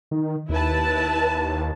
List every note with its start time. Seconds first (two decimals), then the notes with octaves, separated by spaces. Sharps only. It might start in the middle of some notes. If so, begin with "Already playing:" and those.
0.11 D#3
0.49 D#2 E4 B4 A5